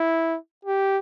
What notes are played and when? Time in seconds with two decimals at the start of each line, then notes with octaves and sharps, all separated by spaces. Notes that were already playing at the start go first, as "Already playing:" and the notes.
Already playing: E4
0.65 G4